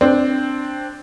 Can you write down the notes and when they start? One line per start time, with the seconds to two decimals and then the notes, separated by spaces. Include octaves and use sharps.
0.01 C4 D4